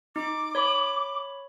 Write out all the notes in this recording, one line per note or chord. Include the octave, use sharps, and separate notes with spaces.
D#4 D6
C#5 B5